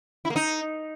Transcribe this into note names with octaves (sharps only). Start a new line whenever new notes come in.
E4
A#3
D#4